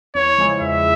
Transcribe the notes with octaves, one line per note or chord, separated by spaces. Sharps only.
E2 C#5
C#3 F3 G#3 E4
E2 E5